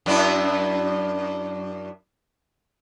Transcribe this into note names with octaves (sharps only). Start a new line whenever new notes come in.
F#2 D4 E4